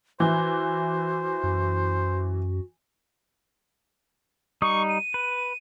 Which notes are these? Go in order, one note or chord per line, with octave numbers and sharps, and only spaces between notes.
E3 F#4 C5
F#2
G3 D#4 C#6 D#6
D#7
B4